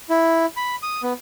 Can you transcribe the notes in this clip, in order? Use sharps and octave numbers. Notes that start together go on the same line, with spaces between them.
E4
B5
D#6
B3